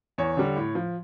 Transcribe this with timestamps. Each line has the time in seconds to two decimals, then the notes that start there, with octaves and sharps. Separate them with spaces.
0.18 E2 C#5
0.37 D3 G3
0.56 A2
0.75 F3